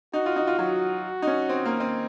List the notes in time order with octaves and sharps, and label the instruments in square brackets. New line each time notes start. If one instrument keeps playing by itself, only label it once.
[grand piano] D#4 [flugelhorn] F#4
[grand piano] F4
D#4
F4
[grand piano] F#3 [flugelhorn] F#4
[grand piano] D#4
C#4
C4
A#3
C4